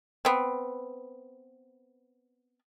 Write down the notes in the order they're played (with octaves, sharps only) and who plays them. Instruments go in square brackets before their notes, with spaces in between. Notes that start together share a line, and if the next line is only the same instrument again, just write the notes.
[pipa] B3 C4